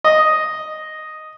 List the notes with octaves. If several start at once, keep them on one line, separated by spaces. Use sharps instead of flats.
D#5